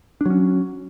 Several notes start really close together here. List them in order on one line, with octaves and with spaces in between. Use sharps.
D4 F#3 C#4